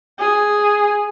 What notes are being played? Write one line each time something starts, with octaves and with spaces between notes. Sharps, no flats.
G#4